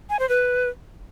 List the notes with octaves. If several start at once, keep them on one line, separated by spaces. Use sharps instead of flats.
G#5
C5
B4